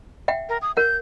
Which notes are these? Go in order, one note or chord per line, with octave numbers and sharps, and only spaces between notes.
E5 F#5 G5
A#4
D#6
A#4 F#5 G6